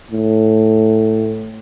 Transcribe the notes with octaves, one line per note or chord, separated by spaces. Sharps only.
A2